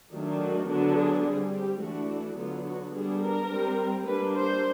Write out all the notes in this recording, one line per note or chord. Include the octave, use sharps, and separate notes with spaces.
D#3 F#3 A3 D4
F#4
D3 F#3 B3 D4 F#4
G#4
G3 C4 G#4
G4
E3 A3 D4 F#4
D3 F#3 B3 F4
F#4
G3 B3 D4 G#4
A#4
G3 C4
G3 A#3 D4 B4
C5